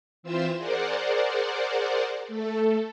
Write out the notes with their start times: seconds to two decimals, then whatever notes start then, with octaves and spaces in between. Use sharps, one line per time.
0.23 E3 C4 F4 C5 E5 E6
0.57 G#4 A#4 C5 D5 F#5
2.28 A3 A4